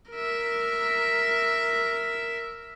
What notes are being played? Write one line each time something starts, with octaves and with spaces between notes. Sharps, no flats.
A#4 E5